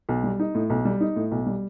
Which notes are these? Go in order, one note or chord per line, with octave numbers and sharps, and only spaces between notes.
B1
G3
D#4
A2
B1
G3
D#4
A2
B1
G3